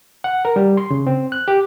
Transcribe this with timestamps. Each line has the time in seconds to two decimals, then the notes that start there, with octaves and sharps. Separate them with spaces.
0.24 F#5
0.45 A#4
0.56 G3
0.77 C6
0.90 C#3
1.07 C4
1.32 F#6
1.48 G4